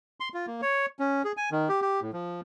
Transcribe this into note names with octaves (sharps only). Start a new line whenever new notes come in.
C6
F4
A#3
C#5
C#4
G#4
G#5
D#3
G4
G4
A2
F3